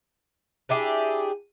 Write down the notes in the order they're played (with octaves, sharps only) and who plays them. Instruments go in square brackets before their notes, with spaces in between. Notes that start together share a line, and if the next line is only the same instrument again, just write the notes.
[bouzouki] D4 E4 G4 G#4